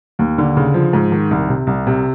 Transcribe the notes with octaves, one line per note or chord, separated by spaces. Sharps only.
D#2
D3
C#3
F3
G#2
D#3
C2
C3
C2
C3